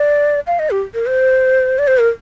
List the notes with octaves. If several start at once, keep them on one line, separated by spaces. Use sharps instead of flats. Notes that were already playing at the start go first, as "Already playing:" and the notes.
Already playing: D5
F5
D#5
G4
A#4
C5
D5
C5
A#4